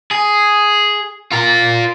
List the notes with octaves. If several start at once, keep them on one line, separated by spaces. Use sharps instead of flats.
G#4
F4 A#4